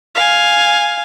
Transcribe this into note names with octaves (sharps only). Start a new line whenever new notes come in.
F5 G#5